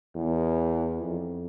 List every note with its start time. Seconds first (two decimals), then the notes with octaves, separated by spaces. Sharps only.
0.15 E2
1.01 F2